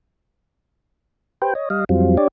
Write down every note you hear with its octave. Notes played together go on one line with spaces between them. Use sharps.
G4 B4 C5 G5
C#5 D#5
G3 D#5 F5
F2 F#3 G3 C4 F4
D4 G4 C#5 D5